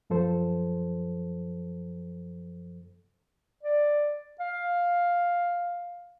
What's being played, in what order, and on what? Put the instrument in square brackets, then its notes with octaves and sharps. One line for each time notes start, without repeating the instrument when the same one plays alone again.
[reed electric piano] F#2 F3 A4 C5
[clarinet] D5
F5